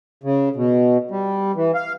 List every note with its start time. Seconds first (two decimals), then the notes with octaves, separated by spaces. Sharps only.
0.23 C#3
0.56 B2
1.11 G3
1.55 E3
1.75 F5